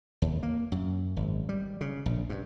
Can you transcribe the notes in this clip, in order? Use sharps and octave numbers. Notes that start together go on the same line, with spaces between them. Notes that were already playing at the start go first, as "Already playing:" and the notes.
D#2
A#3
F#2
G#1
G3
C#3
A#1
G2